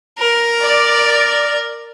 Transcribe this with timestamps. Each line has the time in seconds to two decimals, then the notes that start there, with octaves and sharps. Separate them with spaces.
0.19 A#4
0.60 D5